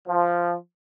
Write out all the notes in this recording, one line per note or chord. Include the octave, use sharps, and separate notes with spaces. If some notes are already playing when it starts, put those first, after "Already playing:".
F3